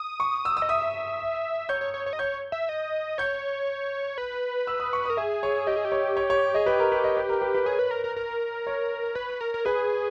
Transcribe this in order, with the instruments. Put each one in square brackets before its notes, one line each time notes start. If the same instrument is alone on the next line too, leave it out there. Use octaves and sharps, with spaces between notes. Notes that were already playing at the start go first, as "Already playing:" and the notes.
Already playing: [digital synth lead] D#6
[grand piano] C#6
E6
E6
[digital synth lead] D#5
[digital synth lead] E5 [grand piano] D#6
[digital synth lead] C#5 [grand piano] G6
[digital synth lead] C#5
C#5
C#5
D#5
[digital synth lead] C#5 [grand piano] G6
[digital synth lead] E5
D#5
[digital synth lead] C#5 [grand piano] G6
[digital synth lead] B4
[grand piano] E6
D#6
C#6
[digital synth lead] A#4 [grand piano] D#6
[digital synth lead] G#4 [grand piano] E5
[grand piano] C#5
[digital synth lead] G4 [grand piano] D#5
[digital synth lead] G#4
G4
[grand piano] C#5
C#5
C#5
[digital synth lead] G#4 [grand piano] D#5
[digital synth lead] G4 [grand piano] B4
[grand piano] A#4
B4
D#5
B4
A#4
B4
B4
[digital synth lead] G#4 [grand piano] C#5
[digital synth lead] B4
A#4
A#4
A#4
[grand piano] C#5
[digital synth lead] B4
A#4
A#4
[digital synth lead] G#4 [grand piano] B4